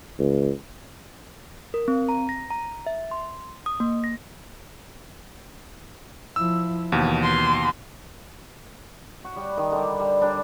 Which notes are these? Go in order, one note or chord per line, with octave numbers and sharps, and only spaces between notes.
C#2
A#4
C4
A#5
A#6
A#5
E5
C6
D#6
A#3
A#6
F3 E4 E6
D#2 B2 E3
C6
F#4
G3
D#3
D3 G3
G3
G3 D4